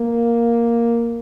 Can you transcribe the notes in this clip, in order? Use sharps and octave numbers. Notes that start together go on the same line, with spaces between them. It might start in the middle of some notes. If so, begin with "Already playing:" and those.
Already playing: A#3